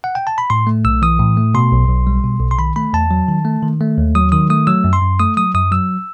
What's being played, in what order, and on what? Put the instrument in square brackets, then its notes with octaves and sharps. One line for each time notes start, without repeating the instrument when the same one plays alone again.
[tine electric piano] F#5
G5
A5
B5
A2 C6
A3
B1 E6
E3 D#6
A2
A3
B2 C6
B1
B1
G3
B2
B1
C6
D#3 B5
A3 B5
E2 A5
F#3
D#3
A3
D#3
A3
D#2
F#3 D#6
D#3 D#6
A3 D#6
F#3 E6
F#2
C6
F#2
A3 D#6
F#3 D#6
F#2 D#6
F#3 E6